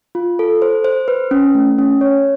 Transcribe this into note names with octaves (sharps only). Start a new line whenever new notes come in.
F4
A4
C5
C5
B4
C#4
A3
C#4
C#5